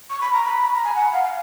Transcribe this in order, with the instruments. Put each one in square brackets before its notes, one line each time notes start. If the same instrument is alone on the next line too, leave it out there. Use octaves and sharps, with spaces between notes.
[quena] C#6
B5
A#5
B5
B5
A#5
G#5
F#5
F5
F5